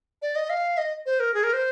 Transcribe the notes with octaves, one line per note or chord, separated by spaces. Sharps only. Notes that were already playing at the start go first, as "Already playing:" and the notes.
D5
D#5
F5
D#5
C5
A#4
G#4
A#4
C5